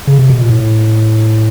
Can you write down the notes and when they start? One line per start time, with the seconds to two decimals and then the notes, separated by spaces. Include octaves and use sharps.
0.07 C#3
0.19 C3
0.30 B2
0.40 A#2
0.49 A2